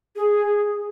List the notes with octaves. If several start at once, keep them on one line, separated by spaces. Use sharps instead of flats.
G#4